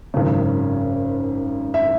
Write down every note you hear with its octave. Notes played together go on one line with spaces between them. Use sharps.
G#1 F#2 C#3
E5